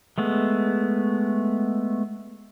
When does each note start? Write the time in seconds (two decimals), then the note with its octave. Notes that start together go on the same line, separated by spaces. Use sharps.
0.18 G#3 A3 B3